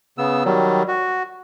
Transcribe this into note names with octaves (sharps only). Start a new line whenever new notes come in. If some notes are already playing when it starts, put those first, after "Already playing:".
C#3 B3 E6
D#3 F#3 G3
F#4